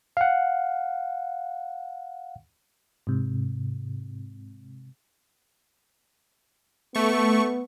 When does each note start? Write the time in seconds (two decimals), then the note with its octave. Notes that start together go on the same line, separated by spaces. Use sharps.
0.17 F5 F#5
3.07 G#2 C3
6.95 A3 B3 C#6